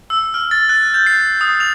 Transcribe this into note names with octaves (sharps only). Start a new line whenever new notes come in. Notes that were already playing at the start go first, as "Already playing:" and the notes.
E6
F6
A6
F#6
G6
C7
D#6
F7